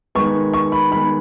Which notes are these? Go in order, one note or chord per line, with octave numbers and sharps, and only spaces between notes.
D#3 G#3 B3 C#6
C#6
B5
D#3 G#3 B3 B5